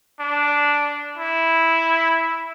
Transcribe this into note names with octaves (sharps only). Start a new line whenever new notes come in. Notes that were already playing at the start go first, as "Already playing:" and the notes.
D4
E4